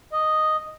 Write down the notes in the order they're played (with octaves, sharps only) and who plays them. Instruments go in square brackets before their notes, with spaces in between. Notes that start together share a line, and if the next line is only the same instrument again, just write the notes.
[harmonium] D#5